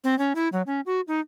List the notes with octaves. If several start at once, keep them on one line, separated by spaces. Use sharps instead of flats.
C4
C#4
E4
F#3
C#4
F#4
D#4